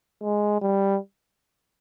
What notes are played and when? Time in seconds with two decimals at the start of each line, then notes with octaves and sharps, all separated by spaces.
0.22 G#3
0.62 G3